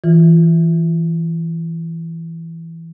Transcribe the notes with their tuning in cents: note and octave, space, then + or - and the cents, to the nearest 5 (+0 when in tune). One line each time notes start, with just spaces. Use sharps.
E3 +0 F4 +0